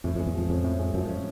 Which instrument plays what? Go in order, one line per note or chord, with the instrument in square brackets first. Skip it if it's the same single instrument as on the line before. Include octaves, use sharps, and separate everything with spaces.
[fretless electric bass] F2 [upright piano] A2
[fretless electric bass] F2 [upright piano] G#3
[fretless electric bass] E2
[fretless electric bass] F2 [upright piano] F3
[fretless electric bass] F2 [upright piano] C#4
[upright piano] A2
G#3
[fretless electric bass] F#2 [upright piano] F3
[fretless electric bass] F2 [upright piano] C#4